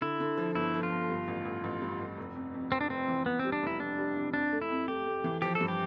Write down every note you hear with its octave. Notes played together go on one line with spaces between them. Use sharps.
D3 E4
D3
F3
G1 E4
F3
F4
G1
G2
A1
A1
A1
G2
A1
F1
F2
F2
F1 C4
D4
F1 C4
E3
E2 B3
C4
G3
D4
F1 E4
F1 D4
G3
C3
F2 D4
A3
E4
F2
A3 G4
A3
E3
F3 G4
A4
G2
G4